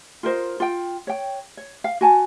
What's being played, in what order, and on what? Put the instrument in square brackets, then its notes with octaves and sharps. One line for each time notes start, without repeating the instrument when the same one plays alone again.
[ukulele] F4 A#4 C5 D#5
F4 G5
C#5 G5
C#5
F5
F#4 G#5 A5